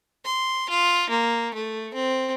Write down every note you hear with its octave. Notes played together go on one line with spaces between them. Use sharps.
C6
F4
A#3
A3
C4